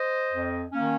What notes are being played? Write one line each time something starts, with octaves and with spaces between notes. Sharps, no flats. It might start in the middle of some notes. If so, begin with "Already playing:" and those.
Already playing: C5 D#5
F2
D#3 A#3 C#4